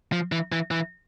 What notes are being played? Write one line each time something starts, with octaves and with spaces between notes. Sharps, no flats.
F3
E3
E3
E3